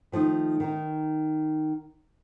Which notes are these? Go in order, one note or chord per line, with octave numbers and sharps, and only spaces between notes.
D#3 F3 A3 D#4
D#3 D#4